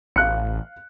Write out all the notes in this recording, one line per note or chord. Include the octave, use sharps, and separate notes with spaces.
A1 F5 F#6 C#7